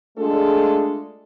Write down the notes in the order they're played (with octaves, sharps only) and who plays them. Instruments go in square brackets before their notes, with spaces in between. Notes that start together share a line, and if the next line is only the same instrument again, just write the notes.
[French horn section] G#3 A3 D4 F4 G#4 A4